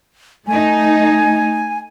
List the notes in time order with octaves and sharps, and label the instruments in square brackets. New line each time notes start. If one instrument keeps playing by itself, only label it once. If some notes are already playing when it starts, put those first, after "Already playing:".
[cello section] A3 D#4 [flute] G#5